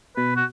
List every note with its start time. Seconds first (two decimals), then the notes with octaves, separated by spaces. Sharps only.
0.16 B2 B4
0.36 F#4